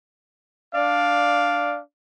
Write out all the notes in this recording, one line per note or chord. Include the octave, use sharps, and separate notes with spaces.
D4 D5 F5